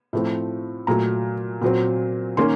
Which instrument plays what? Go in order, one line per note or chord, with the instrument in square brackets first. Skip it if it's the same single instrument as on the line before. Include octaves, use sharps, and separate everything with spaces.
[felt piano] A2 F3 A3 C4
A#2 F#3 A3 A#5
A#2 F#3 C4
D#3 A#3 C#4 C6